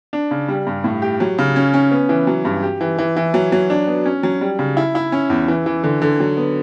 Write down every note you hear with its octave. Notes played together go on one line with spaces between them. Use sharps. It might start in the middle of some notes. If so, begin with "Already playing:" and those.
D4
C#3
G3
G2
A2
G4
F#3
C#3
C#4
C#4
B3
E3
F#3
G2
G4
E3
E3
E3
F#3
F#3
D4
B3
C#4
F#3
G3
C#3
E4
E4
C#4
E2
E3
E3
D3
D3
F#3
B3